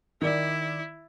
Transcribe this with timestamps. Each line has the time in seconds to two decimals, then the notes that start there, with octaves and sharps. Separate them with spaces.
0.22 D#3 E4 D5